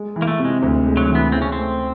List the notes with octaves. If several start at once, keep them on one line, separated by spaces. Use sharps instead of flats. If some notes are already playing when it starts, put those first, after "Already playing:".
Already playing: G#3
E3
A#3
A3
C3
G#3
D2
G#3
F#3
E3
B3
C#3 C4
C#4
A3 C4